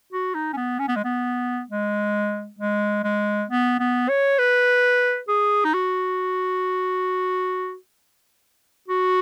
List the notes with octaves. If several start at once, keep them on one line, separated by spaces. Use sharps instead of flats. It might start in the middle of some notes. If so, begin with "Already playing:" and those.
F#4
D#4
C#4
B3
C#4
B3
G#3
B3
G#3
G#3
G#3
B3
B3
C#5
B4
G#4
D#4
F#4
F#4